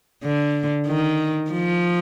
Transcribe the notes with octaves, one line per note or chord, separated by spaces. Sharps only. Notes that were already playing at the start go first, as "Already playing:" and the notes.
D3
D#3
F3